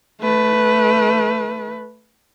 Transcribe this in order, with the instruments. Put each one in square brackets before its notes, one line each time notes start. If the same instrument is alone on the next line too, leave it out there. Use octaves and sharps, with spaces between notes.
[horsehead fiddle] A3 B4